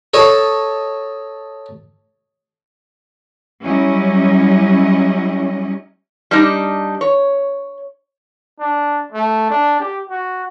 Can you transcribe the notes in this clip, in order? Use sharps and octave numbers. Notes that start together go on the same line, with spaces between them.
A4 C#5 D#5 A5
F#3 G3 C#4 E4 D#5
G3 D4 D#4
C#5
D4
A3
D4
G4
F#4